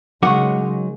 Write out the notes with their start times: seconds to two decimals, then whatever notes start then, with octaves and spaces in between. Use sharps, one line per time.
0.23 C#3 F#3 G#3 D#4 A#4 F#5 C#6 D6